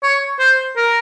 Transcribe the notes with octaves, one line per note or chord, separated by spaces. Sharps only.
C#5
C5
A#4